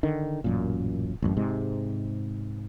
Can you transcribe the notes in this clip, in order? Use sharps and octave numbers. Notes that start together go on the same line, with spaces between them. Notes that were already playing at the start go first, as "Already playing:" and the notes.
D3 D#3
A1 F#2 A#2
A1 F#2
G#2 C3 G#3